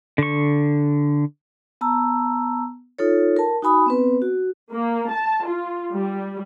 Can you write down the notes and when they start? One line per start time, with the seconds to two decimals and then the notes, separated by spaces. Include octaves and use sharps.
0.18 D3 C#6
1.81 B3 A5 A#5 E6
2.99 D#4 F4 A4 C#5
3.37 A#4 A5
3.62 D#4 F#4 G#5 B5 D#6
3.86 B3 C4 B4
4.22 F#4
4.72 A#3
5.12 A5
5.46 F4
5.92 G3